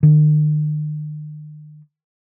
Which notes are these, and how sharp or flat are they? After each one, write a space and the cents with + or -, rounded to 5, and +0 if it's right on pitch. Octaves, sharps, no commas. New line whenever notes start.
D#3 -45